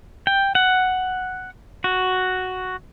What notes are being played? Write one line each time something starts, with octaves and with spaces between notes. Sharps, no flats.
G5
F#5
F#4